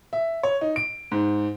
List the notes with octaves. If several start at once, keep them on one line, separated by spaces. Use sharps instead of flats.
E5
C#5
D#4
D7
G#2